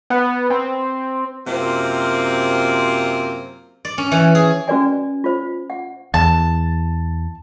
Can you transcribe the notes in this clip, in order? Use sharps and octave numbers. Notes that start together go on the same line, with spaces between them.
B3
C4
F#2 C3 A#3 C4 F4 C5
D5
C#4
E3
G#4
C#4 F#4 B4 D5 G#5
F4 C5
F#5
E2 A5